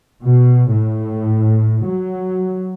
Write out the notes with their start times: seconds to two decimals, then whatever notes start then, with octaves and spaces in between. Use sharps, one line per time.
0.22 B2
0.73 A2
1.86 F#3